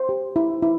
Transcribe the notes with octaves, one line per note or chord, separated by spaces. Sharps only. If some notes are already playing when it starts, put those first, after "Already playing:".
Already playing: C5
G4
E4
E4